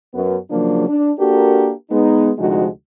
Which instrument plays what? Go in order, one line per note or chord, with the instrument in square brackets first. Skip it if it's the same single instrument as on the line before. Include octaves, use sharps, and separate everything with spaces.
[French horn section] F#2 B3
C#3 F3 F#3 A#3 D4
D4
A#3 D4 F#4 G4 A4 A#4
G#3 B3 D#4
D2 C3 F3 G#3 D#4 F#4